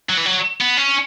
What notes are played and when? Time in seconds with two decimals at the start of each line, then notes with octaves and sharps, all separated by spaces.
0.09 F#3
0.18 E3
0.26 F#3
0.60 B3
0.77 C#4